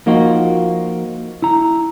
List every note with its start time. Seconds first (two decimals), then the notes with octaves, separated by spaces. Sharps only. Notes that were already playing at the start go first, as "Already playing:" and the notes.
0.06 F3 A#3 D#4 F4 F#4
1.42 E4 A#5